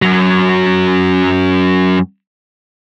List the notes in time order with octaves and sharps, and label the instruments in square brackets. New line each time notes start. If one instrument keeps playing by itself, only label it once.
[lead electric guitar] F#2 F#3